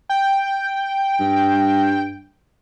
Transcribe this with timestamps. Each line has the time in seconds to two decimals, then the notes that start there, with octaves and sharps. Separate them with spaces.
0.09 G5
1.20 G2